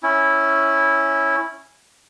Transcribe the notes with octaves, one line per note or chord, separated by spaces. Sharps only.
C#4 E4